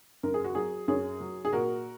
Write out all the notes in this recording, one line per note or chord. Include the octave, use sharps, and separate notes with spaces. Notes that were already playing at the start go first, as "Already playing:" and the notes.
F#2 A#4
G#4
F#4
F#3 G#4
F#2 G#4 C#5
F#3
G#4
A#2 F#4 A#4